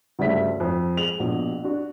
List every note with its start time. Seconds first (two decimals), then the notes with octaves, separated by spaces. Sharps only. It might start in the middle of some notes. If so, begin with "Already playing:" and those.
0.19 D2 G2 C#3 E5 B6
0.60 F2
0.96 G#3 F7 F#7
1.19 A#1 B2
1.64 D4 F#4